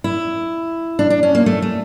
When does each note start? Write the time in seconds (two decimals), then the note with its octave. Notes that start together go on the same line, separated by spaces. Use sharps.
0.04 E4
0.99 D4
1.10 D4
1.23 C#4
1.35 A#3
1.46 A3
1.62 A3